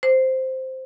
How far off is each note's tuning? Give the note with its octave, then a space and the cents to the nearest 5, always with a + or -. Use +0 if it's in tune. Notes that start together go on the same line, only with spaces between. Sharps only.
C5 +0